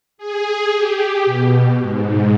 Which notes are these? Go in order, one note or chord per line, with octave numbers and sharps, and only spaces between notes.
G#4
G4
B2
G#2